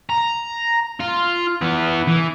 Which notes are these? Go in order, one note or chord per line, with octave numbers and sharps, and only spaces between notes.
A#5
F4
E3 B3
E3